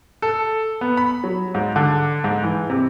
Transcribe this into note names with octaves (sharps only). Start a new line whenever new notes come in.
A4
B3
B5
F#3
G#2
D3
G#2
E3
C3